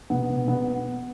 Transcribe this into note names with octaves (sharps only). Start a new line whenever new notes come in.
B2 B3
B2
B2 B3